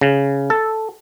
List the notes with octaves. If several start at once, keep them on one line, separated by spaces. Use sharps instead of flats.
C#3
A4